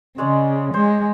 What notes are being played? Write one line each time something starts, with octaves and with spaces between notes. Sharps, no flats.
C#3 G#3 C#4 D5
G#3 C5